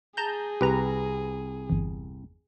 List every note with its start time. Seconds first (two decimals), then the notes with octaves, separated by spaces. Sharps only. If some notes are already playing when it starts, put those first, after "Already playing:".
0.17 G#4 A5 A#5 G6
0.61 C2 G4 B4 A#5
1.70 G1 E2